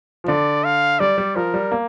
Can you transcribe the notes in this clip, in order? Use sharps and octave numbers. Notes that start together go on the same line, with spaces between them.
F3
D3 D5
F5
G3 D5
G3
F3 A#4
G3
A#3